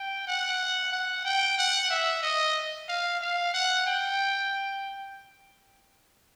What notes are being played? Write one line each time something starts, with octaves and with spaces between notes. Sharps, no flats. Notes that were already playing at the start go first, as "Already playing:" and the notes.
Already playing: G5
F#5
F#5
G5
F#5
E5
D#5
F5
F5
F#5
G5